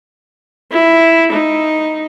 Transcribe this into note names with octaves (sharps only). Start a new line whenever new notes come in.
E4
D#4